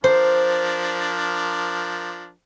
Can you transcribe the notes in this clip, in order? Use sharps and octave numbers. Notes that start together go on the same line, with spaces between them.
F3 D4 A#4 C5